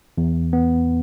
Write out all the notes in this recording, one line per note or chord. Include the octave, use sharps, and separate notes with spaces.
E2
B3